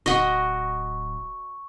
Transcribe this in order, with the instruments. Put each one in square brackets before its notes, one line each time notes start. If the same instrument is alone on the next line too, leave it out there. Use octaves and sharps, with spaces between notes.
[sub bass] D1 [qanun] F#4 D#5 [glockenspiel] C#6